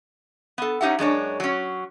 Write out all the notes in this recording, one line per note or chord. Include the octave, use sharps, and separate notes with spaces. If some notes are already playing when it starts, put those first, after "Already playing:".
B3 A4
C#4 D#4 G4 E5 F#5
F#2 G#3 D4 C#5
F#3 C#4